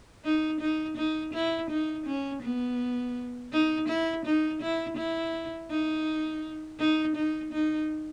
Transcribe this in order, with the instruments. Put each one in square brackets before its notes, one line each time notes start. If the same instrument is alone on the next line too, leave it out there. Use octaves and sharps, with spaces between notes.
[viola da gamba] D#4
D#4
D#4
E4
D#4
C#4
B3
D#4
E4
D#4
E4
E4
D#4
D#4
D#4
D#4